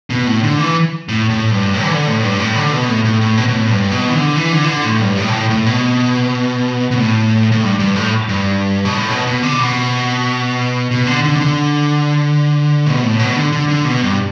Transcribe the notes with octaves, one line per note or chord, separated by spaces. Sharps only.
B2
A2
D3
E3
A2
A2
G2
A2
E3
D3
A2
G2
A2
D3
B2
A2
A2
A2
B2
B2
A2
G2
B2
E3
D3
E3
D3
E3
D3
A2
G2
A2
B2
A2
A2
B2
B2
A2
A2
G2
G2
A2
G2
B2
A2
B2
B2
D3
B2
B2
D3
D3
B2
D3
B2
A2
B2
D3
D3
D3
B2
G2